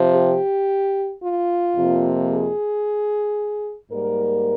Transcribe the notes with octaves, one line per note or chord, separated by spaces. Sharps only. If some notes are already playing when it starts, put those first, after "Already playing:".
Already playing: C3 F3 C4
G4
F4
F2 C3 F3 A#3
G#4
G#2 G3 A#3 A#4